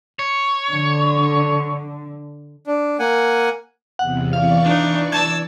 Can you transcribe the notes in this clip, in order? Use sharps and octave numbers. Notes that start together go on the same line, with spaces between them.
C#5
D3
D4
A#3 F#5 G#5
E2 C3 F#5
E3 D5 F5 C#6
D4 D#4
A5 E6 G#6